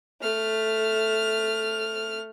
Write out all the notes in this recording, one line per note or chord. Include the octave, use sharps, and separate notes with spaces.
A3 F6